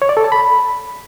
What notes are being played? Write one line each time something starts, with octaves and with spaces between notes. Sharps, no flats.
C#5
D5
A4
A5
B5